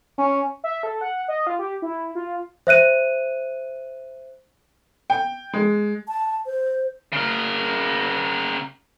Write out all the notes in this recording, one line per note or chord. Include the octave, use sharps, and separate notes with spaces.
C#4
E5
A4
F#5
D#5
F4
G4
E4
F4
C5 E5 F#6 D#7
G5
G#3
A5
C5
C#3 A#4